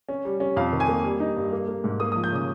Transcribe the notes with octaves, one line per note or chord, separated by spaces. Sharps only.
C#4
G3
C#4
F2 F5
D#3
G#5
A#3
G3
D#4
G2
A#3
A#3
G#2
A#3 D#6
F3 D#6
G6
C#3 D#6